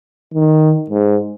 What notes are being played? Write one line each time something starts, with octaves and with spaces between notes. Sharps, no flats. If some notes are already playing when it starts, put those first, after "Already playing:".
D#3
G#2